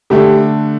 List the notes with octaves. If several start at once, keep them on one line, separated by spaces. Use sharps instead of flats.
D3 A3 D4 G4